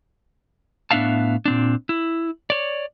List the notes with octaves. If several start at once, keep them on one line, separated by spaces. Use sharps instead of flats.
A2 B3 D4 E5 F5 A5
A#2 C4 D4
E4
C#5 D5